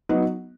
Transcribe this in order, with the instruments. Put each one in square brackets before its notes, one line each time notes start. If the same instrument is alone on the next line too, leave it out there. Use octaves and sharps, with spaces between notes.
[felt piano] F#3 B3 D#4 F#4